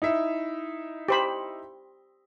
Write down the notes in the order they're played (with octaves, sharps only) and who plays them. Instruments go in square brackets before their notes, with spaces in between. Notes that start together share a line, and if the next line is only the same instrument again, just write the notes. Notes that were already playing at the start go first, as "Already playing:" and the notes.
[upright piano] D#4 E4 E5
[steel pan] G4 C5 B5